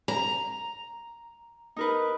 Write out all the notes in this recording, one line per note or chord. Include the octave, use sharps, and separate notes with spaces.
A#5
D#4 A#4 B4